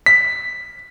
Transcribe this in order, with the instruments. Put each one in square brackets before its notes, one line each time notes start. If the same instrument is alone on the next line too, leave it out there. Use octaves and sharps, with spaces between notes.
[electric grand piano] B6